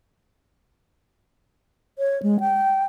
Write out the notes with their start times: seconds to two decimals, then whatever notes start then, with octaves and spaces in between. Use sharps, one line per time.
1.99 C#5
2.23 G#3
2.40 G5